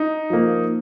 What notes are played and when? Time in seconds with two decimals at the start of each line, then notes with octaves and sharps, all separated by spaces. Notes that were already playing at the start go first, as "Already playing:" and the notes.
Already playing: D#4
0.30 F3 A#3